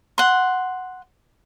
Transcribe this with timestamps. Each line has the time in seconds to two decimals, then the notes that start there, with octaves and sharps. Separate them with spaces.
0.18 F#5 C6